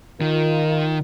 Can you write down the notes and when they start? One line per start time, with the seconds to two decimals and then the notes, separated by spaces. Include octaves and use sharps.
0.21 D#3 F4 A#4